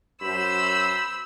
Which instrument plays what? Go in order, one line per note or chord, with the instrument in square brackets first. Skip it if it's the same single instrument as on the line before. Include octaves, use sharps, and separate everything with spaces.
[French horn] F#2 [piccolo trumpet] C5 [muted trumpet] B5 [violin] E6